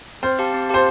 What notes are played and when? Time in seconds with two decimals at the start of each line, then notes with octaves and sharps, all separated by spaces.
0.23 C4 C5
0.39 G4 F5 A5
0.54 C4
0.69 G4 C5 F5 A5